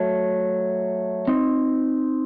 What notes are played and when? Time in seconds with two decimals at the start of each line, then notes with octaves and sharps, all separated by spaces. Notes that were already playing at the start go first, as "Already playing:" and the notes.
Already playing: F#3 A3
1.28 C4 D#4